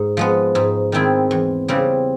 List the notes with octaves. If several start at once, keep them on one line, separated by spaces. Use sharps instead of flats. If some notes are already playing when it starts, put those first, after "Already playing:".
Already playing: G#2
F3 G#3 B3
G#2
D#3 G#3 C4 E4
E2
C#3 E3 G3 C4